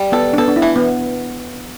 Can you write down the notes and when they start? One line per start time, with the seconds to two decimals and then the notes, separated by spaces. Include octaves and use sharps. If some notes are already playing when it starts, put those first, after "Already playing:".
Already playing: G3
0.12 B3 A4
0.33 D4
0.38 B3 A4
0.48 D4
0.56 E4
0.62 E3
0.76 B3